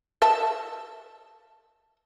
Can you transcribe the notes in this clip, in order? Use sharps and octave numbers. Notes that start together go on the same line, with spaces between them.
D#5 E5 A5